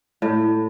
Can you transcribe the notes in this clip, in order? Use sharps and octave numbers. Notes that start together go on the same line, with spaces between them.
A2